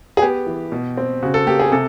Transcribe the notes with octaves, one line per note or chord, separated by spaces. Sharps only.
G#4
B3 G4
E3
B2
C4
C#3 F#4
A4
A#3 G4
G#4
C3 A4